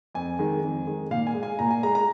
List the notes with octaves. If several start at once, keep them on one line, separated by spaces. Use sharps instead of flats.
F2 G#5
D#3 G#3
F2
D#3 G#3
A#2 F5
G#5
G#3
G#5
A#2 A#5
G#5
G#3 A#5
A#5